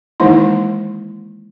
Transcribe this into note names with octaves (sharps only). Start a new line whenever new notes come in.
D#3 E3 G#3 A#3 D#4 E4